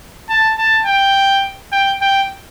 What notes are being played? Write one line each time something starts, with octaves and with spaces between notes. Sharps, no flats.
A5
A5
G5
G5
G5